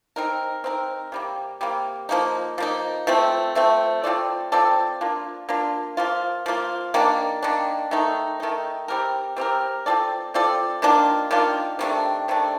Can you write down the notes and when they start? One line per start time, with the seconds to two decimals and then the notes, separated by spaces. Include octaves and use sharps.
0.16 C4 D#4 A#4
0.64 C4 D#4 A#4
1.12 C3 G3 A#3
1.61 C3 G3 A#3
2.09 F3 A#3 D#4
2.58 F3 A#3 D#4
3.07 F3 A3 C4
3.55 F3 A3 C4
4.04 C4 F4 A4 D5
4.52 C4 F4 A4 D5
5.01 A#3 D4 F4
5.49 A#3 D4 F4
5.97 F3 A#3 F4
6.46 F3 A#3 F4
6.94 D#3 A#3 D4
7.43 D#3 A#3 D4
7.91 D#3 A3 D#4
8.40 D#3 A3 D#4
8.88 G3 C4 G4 A#4
9.36 G3 C4 G4 A#4
9.86 C4 F4 A4 D5
10.34 C4 F4 A4 D5
10.82 D#3 A#3 D4 F4
11.31 D#3 A#3 D4 F4
11.79 C3 D#3 A3 D4
12.28 C3 D#3 A3 D4